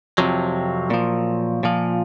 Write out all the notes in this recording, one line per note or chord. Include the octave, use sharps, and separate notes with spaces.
F2 C3 F3 F#3
A#2 F3
A#2 F3